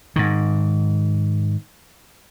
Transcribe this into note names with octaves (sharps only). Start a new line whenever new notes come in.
G#2 D#3